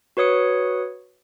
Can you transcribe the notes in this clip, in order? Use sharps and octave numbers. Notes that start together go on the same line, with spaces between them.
F#4 B4 C#5 D#6 C#7